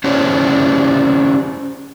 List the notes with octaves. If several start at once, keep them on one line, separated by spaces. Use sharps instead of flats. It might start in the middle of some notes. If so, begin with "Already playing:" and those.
C#4 D4 E4 G4 C5 C#5